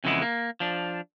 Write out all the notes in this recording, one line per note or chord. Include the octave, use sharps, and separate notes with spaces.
F2 C#3 E3 G#3 B3 E4
A#3
F3 D4